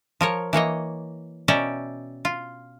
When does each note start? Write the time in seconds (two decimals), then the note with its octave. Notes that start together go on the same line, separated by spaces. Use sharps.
0.21 F3 A#4 C#5
0.53 E3 A#3 C#5 D#5
1.48 B2 C#4 D5 E5 G5 A#5
2.25 F4